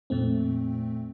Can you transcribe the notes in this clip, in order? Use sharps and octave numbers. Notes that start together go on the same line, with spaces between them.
F2 A#2 A3 C4